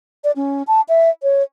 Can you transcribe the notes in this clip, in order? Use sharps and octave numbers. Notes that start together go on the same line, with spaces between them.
D5
C#4
A5
E5
C#5